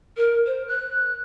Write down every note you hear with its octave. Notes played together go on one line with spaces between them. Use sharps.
A#4
C5
F#6